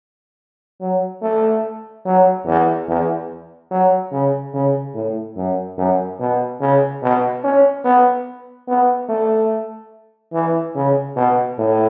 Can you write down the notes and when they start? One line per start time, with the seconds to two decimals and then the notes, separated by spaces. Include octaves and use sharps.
0.81 F#3
1.22 A3
2.05 F#3
2.46 E2
2.88 E2
3.71 F#3
4.12 C#3
4.54 C#3
4.95 A2
5.37 F#2
5.78 F#2
6.20 B2
6.61 C#3
7.02 B2
7.44 C#4
7.85 B3
8.68 B3
9.09 A3
10.33 E3
10.75 C#3
11.16 B2
11.58 A2